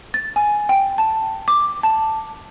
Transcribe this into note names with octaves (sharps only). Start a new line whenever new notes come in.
A6
G#5
G5
A5
D6
A5